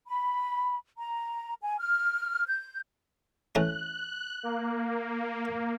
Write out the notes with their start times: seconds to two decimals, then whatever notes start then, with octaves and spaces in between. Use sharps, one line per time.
0.07 B5
0.98 A#5
1.63 G#5
1.78 F6
2.46 G6
3.55 E3 A3 C#4 F#6
4.43 A#3